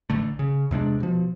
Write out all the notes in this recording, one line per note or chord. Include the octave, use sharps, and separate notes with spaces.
A1 D3 A3
C#3
E2 C3 G#3 D4
B2 F3